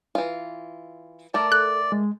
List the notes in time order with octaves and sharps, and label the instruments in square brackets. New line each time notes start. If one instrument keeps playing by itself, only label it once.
[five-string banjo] E3 F4
[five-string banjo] A3 A#4 [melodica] D5 [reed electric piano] A5
[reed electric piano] A4 [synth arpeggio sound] F#6
[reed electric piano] G#3